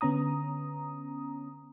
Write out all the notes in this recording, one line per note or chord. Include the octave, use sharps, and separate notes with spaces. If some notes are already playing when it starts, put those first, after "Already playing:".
D3 B3 C#4 A#5 D#6